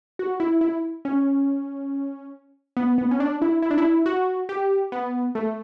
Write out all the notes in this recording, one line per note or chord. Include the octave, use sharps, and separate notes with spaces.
F#4
E4
E4
C#4
B3
B3
C#4
D4
E4
E4
D4
E4
F#4
G4
B3
A3